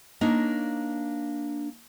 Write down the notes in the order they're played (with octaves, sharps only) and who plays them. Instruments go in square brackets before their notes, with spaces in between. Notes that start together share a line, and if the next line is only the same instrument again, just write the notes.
[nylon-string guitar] A#3 D4 D#4 C#5